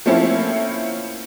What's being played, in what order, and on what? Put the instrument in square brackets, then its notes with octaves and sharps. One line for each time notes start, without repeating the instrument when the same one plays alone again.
[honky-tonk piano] F3 A3 A#3 C4 C#4 E4